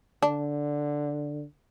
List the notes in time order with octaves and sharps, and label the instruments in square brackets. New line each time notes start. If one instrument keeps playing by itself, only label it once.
[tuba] D3 [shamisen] D4